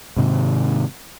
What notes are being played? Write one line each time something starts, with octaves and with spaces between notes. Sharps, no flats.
G#2 C3 D#3